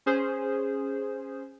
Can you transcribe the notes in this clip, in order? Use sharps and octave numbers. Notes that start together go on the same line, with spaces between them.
C#4 G#4 C5